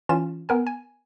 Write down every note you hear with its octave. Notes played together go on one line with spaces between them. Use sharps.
E3 C#4 F4 E7
B3 A#4 G#5
G#5